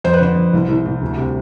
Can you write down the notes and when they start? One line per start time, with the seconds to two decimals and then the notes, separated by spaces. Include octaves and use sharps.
0.04 F2 C5
0.13 B4
0.21 D3 C5
0.36 F2
0.53 C2
0.69 C2
0.86 C2
1.01 D2
1.17 C3